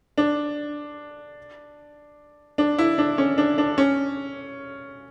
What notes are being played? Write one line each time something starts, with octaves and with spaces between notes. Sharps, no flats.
D4
D4
E4
D4
C#4
D4
D4
C#4